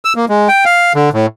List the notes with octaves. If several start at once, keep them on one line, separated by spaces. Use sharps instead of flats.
E6
A#3
G#3
G5
F5
D3
A2